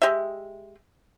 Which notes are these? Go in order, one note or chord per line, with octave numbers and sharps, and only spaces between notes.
G#3 G4 D#5 E5